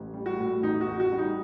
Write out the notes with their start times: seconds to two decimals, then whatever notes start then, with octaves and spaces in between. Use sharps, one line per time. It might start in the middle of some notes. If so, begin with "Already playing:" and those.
Already playing: A1
0.14 G3
0.26 F#4
0.38 A2
0.63 A1 D#4
0.81 F#4
0.87 A1
1.00 F#4
1.12 G3
1.18 D#4